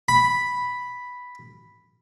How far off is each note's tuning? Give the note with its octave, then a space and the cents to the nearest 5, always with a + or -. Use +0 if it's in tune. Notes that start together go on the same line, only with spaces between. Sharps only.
B5 +0